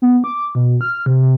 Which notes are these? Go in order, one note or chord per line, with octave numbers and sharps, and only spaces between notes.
B3
D6
B2
F6
C3
C3